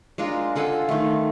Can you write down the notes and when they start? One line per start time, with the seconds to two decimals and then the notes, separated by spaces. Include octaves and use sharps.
0.18 G#3 D4 F4 A#4
0.56 F4 A4 F#5 G#5
0.89 D#3 A3